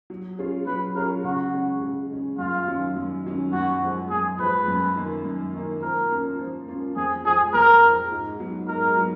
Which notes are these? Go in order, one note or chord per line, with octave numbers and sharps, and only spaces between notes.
F#3
C#4 F4 G#4 C#5
F#3 B4
C#4 F4 G#4 A#4 C#5
C#3 F#4
G#3 C#4
C#3
G#3 C#4
F#2 F4
D#3 F#3 C#4
F#2
D#3 F#3 C#4
F#2 F#4
F3 G#3
F#2 G#4
F3 G#3 B4
F#2
D#3 A#3
F#2
D#3 A#3
F3 A#4
A#3 C#4 F4
F3
A#3 C#4 F4
F2 G#4
F3 G#3 G#4
F2 A#4
F3 G#3
G#2
F#3 B3
G#2 A#4
F#3 B3